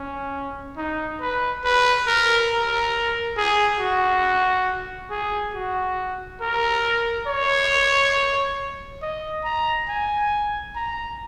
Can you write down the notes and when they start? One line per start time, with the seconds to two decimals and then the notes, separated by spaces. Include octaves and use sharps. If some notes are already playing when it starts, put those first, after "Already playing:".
Already playing: C#4
0.77 D#4
1.21 B4
1.64 B4
2.07 A#4
2.51 A#4
3.37 G#4
3.80 F#4
5.10 G#4
5.54 F#4
6.41 A#4
7.27 C#5
9.02 D#5
9.44 A#5
9.88 G#5
10.75 A#5